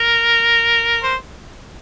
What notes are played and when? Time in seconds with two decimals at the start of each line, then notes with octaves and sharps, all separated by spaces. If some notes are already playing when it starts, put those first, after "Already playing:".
Already playing: A#4
1.03 C5